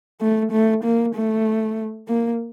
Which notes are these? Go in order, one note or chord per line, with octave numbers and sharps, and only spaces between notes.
A3
A3
A#3
A3
A#3